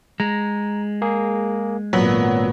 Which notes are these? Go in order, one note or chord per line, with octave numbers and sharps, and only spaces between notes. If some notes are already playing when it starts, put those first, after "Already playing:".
G#3 A#5
A#3 G#4
G#1 A#2 F#3 B3 B5